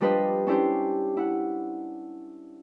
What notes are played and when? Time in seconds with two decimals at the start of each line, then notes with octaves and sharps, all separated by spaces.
0.01 F3 G3 D4 B4 C5 D#5
0.47 C#4 D4 E4 G4 C5
1.17 E4 F#5